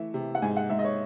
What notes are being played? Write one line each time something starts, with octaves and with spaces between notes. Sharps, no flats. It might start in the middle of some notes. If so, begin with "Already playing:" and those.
Already playing: E3 A3 E5
C3
F#5
G#2 G#5
F#5
G#2 E5
D#5
C#5